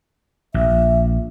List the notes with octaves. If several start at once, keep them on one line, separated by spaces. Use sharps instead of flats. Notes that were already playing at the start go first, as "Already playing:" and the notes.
A#1 E5